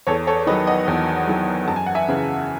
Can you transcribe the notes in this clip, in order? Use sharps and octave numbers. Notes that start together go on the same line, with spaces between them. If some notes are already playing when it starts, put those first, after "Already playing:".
E2 A4 C#5
A4 C#5
D#3 F#3 B4 D#5
D#5 F#5
E2
D#3 F#3
F#2 A5
G#5
F#5
E5 G#5
C#3 E3